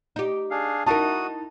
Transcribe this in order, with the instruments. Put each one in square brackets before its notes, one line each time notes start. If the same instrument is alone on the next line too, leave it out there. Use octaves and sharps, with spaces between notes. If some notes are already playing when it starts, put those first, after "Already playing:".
[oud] D#4 G4
[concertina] D4 G#4 F5
[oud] D#4 E4 A#4 [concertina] F#4 D#6 [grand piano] A5